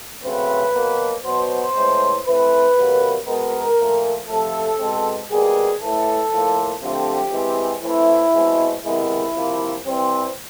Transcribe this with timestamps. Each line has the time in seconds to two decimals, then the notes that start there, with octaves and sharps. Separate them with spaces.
0.22 C#3 F#3 A3 C4 B4
0.73 B2 F#3 A#3
1.24 B2 F#3 B3 C5
1.74 A2 E3 G#3 C4
2.25 E3 A3 C4 B4
2.75 C3 D#3 F#3 A#3
3.26 B2 G#3 B3 A#4
3.77 A#2 F3 A3
4.27 C3 F3 A3 A4
4.79 B2 G#3 C4
5.30 B2 G3 A#3 G#4
5.80 A2 E3 A3 A4
6.31 A2 F3 A#3
6.81 D3 F3 A3 C4 G4
7.32 E3 G#3 C4
7.82 E3 A3 C4 E4
8.33 B2 G#3 C4
8.84 C3 D#3 G#3 B3 E4
9.34 C3 F3 A#3
9.85 E3 G3 C4